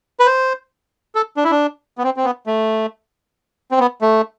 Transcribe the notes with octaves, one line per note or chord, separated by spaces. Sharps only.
B4
C5
A4
D4
E4
D4
B3
C4
C4
B3
A3
C4
B3
A3